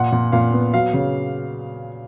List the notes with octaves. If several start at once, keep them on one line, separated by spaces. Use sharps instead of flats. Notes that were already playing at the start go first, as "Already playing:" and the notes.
Already playing: A#2 F#5
A#2
A#2 F5
B3
F#3 F5
C#3